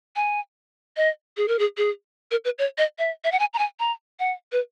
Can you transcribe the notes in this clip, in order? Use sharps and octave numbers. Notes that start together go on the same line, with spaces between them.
G#5
D#5
G#4
A#4
G#4
G#4
A#4
B4
C#5
D#5
E5
E5
F#5
G#5
A#5
G#5
A#5
F#5
B4